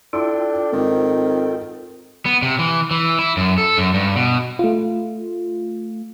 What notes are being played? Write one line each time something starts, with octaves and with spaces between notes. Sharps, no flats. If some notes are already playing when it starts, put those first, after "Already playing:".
D4 E4 F4 A4 G5
G#2 D#3 C4
B3
C3
E3
E3
E4
F#2
A4
F#2
G2
B2
A3 F4